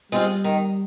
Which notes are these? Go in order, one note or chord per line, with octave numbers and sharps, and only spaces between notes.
G3 G#3 C4 F4
D#3